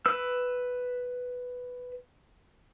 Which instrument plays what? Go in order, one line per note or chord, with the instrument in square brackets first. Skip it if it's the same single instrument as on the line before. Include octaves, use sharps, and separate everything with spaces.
[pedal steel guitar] B4 E6